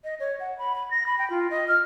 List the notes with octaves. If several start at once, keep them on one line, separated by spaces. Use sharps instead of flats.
D#5
C#5
F#5
B5
B5
A#6
B5
G5
F4
D#5
F6